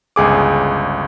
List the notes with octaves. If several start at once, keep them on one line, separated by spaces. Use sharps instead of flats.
G1 C#2 G#4 D6